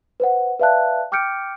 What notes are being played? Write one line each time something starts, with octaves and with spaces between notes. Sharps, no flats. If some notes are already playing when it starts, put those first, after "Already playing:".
B4 C5 F#5
B4 D5 E5 F5 A5 F#6
G5 D6 F6 G6 C#7 D7